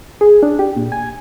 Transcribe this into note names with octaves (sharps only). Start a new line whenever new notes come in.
G#4
D4
G4
A#2
G#5